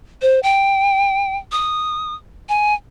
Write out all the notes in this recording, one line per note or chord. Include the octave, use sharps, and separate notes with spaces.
C5
G5
D#6
G#5